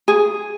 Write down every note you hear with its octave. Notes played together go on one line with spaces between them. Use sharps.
G#4